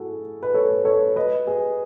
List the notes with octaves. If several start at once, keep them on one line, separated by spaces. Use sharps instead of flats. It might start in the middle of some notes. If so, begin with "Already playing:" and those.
Already playing: E4 F#4 G#4 A4
B4
A4 C#5
A4 C#5
B4 D#5
G#4 B4